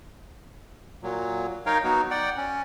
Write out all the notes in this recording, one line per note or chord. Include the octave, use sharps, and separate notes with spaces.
A#2 F#3
D#4 A#4 C#5 F5 G5
F#3 B3 D#4 F#4
D5 F#5 G5
C#4